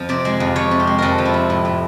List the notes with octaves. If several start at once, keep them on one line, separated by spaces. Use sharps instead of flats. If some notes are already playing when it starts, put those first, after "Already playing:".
Already playing: F2 F3
C3 D5
G#3
F2
F3 C#5
C3
G4
G#3
F2 A4 A#4
F3
E4
C3
A2
A2